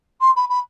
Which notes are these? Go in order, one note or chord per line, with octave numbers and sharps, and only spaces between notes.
C6
B5
B5